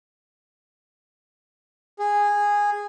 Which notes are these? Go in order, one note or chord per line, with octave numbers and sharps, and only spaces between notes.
G#4